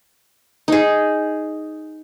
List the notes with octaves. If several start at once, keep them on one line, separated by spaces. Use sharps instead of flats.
D#4 G#4